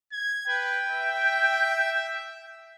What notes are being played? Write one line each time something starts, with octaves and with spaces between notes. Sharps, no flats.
G#6
B4 G5
E5